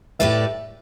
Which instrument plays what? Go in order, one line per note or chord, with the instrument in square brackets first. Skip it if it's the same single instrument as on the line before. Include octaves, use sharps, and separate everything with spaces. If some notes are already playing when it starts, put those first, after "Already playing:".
[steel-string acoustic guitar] A2 A3 G4 B4 D5 [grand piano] E5